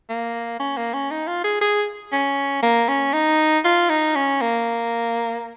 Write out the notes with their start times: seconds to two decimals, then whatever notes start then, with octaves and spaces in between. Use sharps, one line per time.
0.09 A#3
0.60 C#4
0.77 A#3
0.94 C#4
1.11 D#4
1.27 F4
1.44 G#4
1.61 G#4
2.12 C#4
2.63 A#3
2.88 C#4
3.13 D#4
3.64 F4
3.89 D#4
4.16 C#4
4.41 A#3